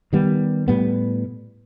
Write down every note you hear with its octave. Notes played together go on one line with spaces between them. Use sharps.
D#3 G3 B3
A2 G3 B3